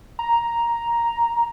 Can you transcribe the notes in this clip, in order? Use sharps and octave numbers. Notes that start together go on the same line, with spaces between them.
A#5